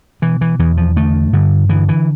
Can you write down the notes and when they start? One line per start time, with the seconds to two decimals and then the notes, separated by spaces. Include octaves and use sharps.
0.22 B2 E3
0.41 E3
0.59 E2 E3
0.77 F3
0.96 D3 A3
1.33 G2 D3
1.69 D3 E3
1.89 E3